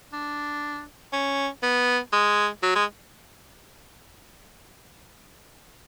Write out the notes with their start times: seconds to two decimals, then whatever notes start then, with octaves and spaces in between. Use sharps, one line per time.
0.13 D4
1.13 C#4
1.63 B3
2.13 G#3
2.63 F#3
2.76 G#3